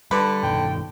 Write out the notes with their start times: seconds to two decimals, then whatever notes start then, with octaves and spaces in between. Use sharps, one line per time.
0.11 D3 G3 B4
0.43 G2 B2 D#3 G5